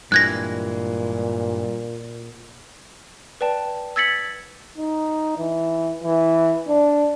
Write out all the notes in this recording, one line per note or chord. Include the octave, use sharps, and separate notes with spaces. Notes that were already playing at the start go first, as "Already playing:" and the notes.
G2 A#2 E3 G#3 F#6 G#6 A#6
B4 D5 G5 A5
E6 G#6 A6 B6 C#7 F#7
D#4
E3
E3
D4